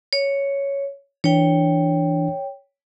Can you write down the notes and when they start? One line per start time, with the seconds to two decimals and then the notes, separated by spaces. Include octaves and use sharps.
0.13 C#5
1.24 E3 D4 C#5 G5